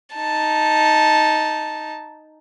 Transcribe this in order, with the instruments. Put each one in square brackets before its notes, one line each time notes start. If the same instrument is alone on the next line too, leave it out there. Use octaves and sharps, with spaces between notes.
[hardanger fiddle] D#4 A5